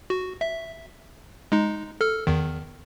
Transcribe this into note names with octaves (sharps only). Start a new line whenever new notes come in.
F#4
E5
G#3 D#4
A4 F6
E2 D#3